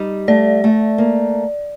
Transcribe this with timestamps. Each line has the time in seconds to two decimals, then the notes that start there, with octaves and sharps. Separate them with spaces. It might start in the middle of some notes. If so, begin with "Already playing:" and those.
Already playing: G3 D#4
0.28 A3 D5
0.64 A3
0.98 A#3